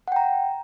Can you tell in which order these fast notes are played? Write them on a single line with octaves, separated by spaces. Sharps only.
F#5 G5 A#5